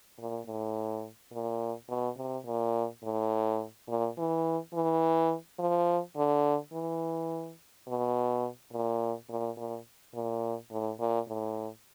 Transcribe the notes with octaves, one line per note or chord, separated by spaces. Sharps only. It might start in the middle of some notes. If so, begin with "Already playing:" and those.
A#2
A2
A#2
B2
C3
A#2
A2
A#2
E3
E3
F3
D3
E3
B2
A#2
A#2
A#2
A#2
A2
A#2
A2